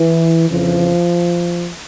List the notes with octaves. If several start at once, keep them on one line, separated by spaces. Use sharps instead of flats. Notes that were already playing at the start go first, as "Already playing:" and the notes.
Already playing: E3
F2 C#3 E3 F3